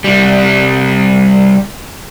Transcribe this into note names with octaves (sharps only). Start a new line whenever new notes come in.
C2 G3